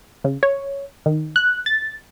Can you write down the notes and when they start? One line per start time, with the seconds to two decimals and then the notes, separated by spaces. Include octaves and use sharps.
0.24 C#3
0.43 C#5
1.06 D#3
1.36 F#6
1.66 A6